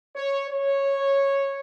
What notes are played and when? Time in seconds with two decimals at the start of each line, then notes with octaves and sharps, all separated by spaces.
0.16 C#5
0.50 C#5